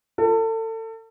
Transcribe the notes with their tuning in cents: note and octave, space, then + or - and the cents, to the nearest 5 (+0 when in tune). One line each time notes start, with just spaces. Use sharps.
A4 +30